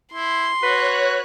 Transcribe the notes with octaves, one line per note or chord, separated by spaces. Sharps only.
E4 C6
F#4 B4 C#5 F#6